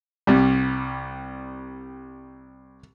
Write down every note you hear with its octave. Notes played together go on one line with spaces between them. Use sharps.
C2 G3